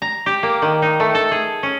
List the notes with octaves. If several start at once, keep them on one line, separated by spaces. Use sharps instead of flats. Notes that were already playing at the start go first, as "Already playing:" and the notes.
A#5
G4
A#3
D#3
D#4
A3
A4
G#4
C#4